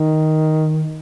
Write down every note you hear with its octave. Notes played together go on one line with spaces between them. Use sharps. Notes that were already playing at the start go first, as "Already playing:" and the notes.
Already playing: D#3